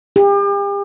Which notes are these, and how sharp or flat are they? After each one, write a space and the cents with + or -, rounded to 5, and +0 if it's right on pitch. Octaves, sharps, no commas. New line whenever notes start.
G4 +40